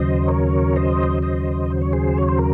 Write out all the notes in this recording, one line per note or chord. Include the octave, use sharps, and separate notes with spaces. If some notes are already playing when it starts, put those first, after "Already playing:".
Already playing: D#2 C#3 F#3 C5 D#5
A#4 C#5
C5 D#5
C5 D#5
C5
C#5
G#4 C5
C#5
C5
A#4